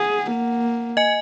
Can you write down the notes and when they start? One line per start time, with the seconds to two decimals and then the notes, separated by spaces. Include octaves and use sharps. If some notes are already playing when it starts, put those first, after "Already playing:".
Already playing: G#4 F#5
0.32 A#3
0.97 D#5 G#5